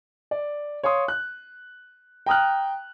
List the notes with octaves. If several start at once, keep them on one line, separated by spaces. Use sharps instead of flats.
D5
C#5 F5 C6 D#6
F#6
G5 A#5 D#6 F6 F#6